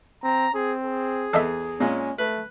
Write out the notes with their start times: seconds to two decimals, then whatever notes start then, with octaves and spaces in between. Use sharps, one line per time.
0.23 C4 A#5
0.54 C4 G#4
0.85 G#4
1.33 E2 A4 D#5 E5
1.80 A#2 G#3 C#4
2.18 A3 B4